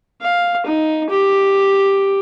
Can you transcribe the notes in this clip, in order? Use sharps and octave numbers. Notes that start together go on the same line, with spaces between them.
F5
D#4
G4